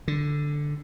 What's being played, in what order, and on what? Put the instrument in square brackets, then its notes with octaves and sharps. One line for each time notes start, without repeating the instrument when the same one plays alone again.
[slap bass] D3